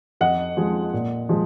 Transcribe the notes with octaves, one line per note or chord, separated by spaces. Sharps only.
F2 D#5 F#5
F3 G#3
A#2
F3 G#3